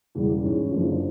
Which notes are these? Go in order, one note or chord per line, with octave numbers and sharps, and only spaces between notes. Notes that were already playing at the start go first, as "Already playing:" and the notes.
E1 E2 C#3 E3 G3
G#2 E3 G#3 C#4
F#1 F#2 D3 F3